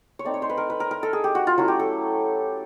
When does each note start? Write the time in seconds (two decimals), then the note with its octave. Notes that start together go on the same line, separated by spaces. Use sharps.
0.19 C#5
0.24 A3 C4 D#4 D5
0.34 C#5
0.42 C5
0.50 B4
0.57 A#4
0.70 B4
0.80 A#4
0.91 A#4
1.03 A4
1.13 G#4
1.24 G4
1.35 F#4
1.47 F4
1.58 F#3 A3 C#4 E4 F#4
1.68 G4
1.79 A4